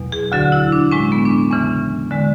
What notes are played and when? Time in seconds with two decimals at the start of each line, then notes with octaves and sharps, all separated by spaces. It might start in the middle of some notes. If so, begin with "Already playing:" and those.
Already playing: E2 B2 F#3
0.12 G#4
0.32 D2 D3 F#3 F#4
0.52 E4
0.72 D4
0.91 A2 G#3 C#4
1.12 B3
1.25 D4
1.31 C#4
1.51 E2 C#3 E3 C#4
2.11 D3 G#3